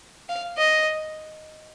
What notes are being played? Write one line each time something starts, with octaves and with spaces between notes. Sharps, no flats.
F5
D#5